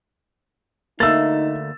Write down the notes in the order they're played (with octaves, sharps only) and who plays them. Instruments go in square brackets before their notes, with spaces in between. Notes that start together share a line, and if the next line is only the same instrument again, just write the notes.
[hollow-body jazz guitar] D2 A3 A#3 [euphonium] D#4 [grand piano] E6 A6